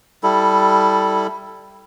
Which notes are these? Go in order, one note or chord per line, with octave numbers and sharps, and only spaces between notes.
G3 E4 A4